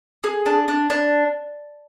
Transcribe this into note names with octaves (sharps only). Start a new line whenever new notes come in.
G#4
D4
D4
D4